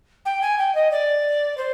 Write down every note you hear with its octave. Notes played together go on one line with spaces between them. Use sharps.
G5
G#5
G5
D#5
D5
C5